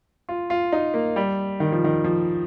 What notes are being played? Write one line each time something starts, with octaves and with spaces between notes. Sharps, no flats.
F4
F4
D#4
A#3
G3
D#3
F3
D#3
F3